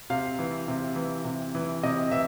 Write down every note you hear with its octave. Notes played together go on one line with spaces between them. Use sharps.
C3 F5
E3
C3
E3
C3
E3
C3 D#5
E3 E5